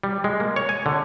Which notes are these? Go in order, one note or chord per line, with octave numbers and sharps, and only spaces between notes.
G3
G#3
A#3
C#5
G#5
D3